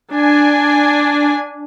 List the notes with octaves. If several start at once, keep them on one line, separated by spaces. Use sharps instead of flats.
D4 G#5